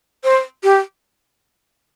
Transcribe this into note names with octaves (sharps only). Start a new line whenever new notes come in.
C5
G4